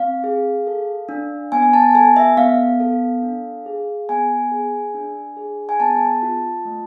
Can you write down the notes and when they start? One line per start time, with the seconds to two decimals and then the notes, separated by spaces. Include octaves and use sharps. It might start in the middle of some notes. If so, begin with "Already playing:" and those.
Already playing: C4 F5
0.24 G#4
0.67 A4
1.09 D4
1.52 B3 G#5
1.62 G#5
1.73 A5
1.95 A4 G#5
2.16 E5
2.37 B3 F5
2.80 A4
3.23 D4
3.66 G#4
4.09 B3 G#5
4.52 G#4
4.94 D4
5.37 G#4
5.69 G#5
5.80 B3 A5
6.23 F4
6.65 A3